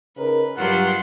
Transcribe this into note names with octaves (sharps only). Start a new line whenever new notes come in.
C#3 D#4 A#4 B4
G2 F#3 G3 F4 G4 F#5 C6